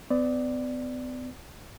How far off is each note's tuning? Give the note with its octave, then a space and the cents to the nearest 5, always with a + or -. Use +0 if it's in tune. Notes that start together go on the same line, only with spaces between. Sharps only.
B3 +45 D5 +0